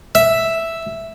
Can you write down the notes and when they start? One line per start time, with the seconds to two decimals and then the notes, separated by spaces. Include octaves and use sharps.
0.15 E5